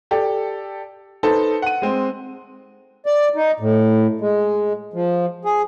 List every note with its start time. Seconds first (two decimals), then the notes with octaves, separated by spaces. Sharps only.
0.11 G4 A4 D5
1.23 D#4 A4 B4 C5 A5
1.62 F#5 D#7
1.82 G#3 C4
3.06 D5
3.36 D#4
3.60 A2
4.21 G#3
4.93 F3
5.45 G#4